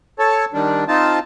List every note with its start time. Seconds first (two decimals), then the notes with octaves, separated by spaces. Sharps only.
0.19 A4 C#5 A5
0.53 D#3 G3 D4
0.88 C4 D#4 F4 A5